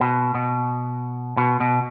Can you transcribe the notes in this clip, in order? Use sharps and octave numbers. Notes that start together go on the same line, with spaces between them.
B2
B2
B2
B2